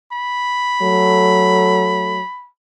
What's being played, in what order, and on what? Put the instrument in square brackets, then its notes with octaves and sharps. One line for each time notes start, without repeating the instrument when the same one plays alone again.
[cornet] B5
[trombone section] F#3 A3 A4